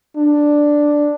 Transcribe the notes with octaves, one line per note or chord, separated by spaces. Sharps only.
D4